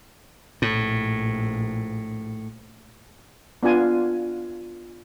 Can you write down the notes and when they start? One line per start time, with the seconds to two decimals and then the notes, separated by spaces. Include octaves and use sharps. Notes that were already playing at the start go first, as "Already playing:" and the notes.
0.62 A#1 A2
3.63 B3 D4 F4 G#5